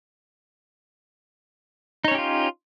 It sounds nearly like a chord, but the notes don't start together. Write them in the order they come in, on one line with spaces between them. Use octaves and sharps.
D#4 C#5 C#4 G4 F4